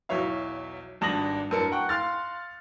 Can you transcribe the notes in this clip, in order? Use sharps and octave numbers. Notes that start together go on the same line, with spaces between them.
B1 E2 F#3 C#5 E5 F5
G#1 G2 D4 D#6 A#6 F#7
F#2 D4 A#4 A5 C#7
F#5 G5 C#6 F#6
F5 C6 F6 A6